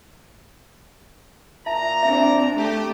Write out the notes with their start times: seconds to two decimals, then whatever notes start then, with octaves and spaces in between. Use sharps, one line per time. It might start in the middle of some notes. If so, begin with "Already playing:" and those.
1.66 A#2 E5 A5 A#5
2.03 C4 D4 E5
2.57 A3 G4